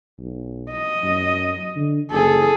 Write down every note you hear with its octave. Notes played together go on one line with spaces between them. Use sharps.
B1
D#5
F#2
D3
F#1 G#4 A4